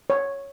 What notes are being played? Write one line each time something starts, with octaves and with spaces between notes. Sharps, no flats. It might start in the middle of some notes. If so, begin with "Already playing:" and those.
C#5